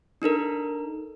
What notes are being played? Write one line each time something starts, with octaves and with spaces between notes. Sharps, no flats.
D4 D#4 A4 A#4